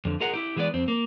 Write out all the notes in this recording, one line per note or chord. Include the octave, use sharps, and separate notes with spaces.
F2 D3
F4 G#4 A#4 D#5 F#5
E4 G4
E3 G#3 B3 F4 D5
F2 C4
A#3